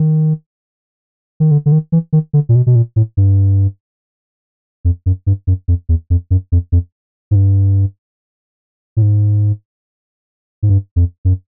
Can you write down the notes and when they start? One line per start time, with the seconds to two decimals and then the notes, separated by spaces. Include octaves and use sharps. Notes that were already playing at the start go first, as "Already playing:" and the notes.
Already playing: D#3
1.40 D#3
1.51 D3
1.66 D3
1.72 D#3
1.92 E3
2.13 D#3
2.33 D3
2.49 A#2
2.55 B2
2.67 B2
2.75 A#2
2.96 A2
3.17 G2
4.85 F2
5.06 F#2
5.27 G2
5.47 F#2
5.68 F2
5.89 E2
6.10 F2
6.31 F#2
6.52 F2
6.72 F2
7.31 G#2
7.35 G2
8.97 A2
9.02 G#2
10.63 G#2
10.69 G2
10.96 F2
11.25 F#2